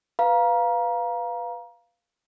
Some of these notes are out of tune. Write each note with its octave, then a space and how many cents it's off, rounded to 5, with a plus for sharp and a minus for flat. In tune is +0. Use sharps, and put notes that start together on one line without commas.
B4 +0 F5 +0 A#5 +25